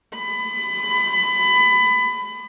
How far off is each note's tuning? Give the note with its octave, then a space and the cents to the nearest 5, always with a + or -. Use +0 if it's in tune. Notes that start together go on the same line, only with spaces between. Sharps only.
B5 +25